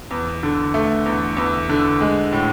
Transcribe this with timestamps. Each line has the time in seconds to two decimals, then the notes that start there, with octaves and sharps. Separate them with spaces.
0.11 E2
0.43 D3
0.74 A3
1.06 E2
1.37 E2
1.69 D3
2.01 G#3
2.32 A2